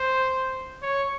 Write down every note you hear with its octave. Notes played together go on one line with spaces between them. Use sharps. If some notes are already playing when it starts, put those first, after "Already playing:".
Already playing: C5
C#5